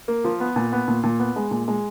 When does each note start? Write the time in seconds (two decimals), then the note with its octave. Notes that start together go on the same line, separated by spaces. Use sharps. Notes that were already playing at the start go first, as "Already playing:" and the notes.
0.08 A#3
0.24 F3
0.40 B3
0.56 A#2
0.72 B3
0.88 A#2
1.03 A#2
1.19 B3
1.36 G#3
1.51 A#2
1.68 G#3